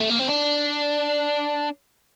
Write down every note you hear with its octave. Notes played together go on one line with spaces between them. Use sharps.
A3
A#3
C4
D4